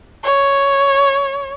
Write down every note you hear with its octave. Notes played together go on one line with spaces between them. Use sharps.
C#5